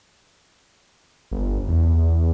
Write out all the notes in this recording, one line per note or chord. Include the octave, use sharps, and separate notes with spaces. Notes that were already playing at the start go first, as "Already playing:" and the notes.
G1
E2